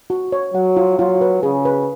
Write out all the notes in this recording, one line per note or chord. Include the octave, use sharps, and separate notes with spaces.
F#4
C#5
F#3 F#5
F4
F#3 F4
B4
C#3 G#4
B4